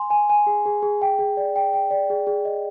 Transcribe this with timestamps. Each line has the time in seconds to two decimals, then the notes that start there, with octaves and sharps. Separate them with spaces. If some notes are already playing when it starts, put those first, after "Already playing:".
Already playing: G#5 C6
0.10 G#5
0.30 G#5
0.47 G#4
0.66 G#4
0.82 G#4
1.02 G5
1.19 G#4
1.37 D5
1.56 G5
1.73 G5
1.91 D5
2.10 G#4
2.27 G#4
2.45 D#5